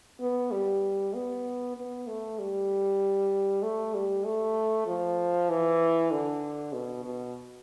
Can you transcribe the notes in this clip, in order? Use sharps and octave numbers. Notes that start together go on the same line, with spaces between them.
B3
G3
B3
B3
A3
G3
A3
G3
A3
F3
E3
D3
B2
B2